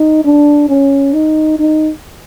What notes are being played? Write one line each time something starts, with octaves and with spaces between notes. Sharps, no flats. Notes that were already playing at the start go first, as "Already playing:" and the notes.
Already playing: D#4
D4
C#4
D#4
D#4